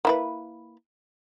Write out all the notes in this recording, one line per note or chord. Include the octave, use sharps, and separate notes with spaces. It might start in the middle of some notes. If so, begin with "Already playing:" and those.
A#3 E4 B4